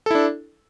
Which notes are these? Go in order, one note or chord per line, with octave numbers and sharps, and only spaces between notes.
D4 E4 A4